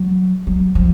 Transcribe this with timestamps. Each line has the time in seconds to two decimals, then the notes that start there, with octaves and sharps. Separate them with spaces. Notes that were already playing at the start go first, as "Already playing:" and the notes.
Already playing: F#3
0.47 F#3
0.75 F3